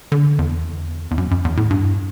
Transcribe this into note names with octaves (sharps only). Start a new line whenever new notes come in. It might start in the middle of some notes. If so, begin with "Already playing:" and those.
D3
E2
E2
F#2
F#2
E2
A2
G2